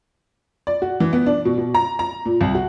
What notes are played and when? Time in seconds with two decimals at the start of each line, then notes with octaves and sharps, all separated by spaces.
0.67 D5
0.82 F#4
1.00 E3
1.13 B3
1.26 D4
1.45 B2
1.58 B2
1.74 A#5
1.99 A#5
2.25 A#2
2.41 C2
2.55 F#4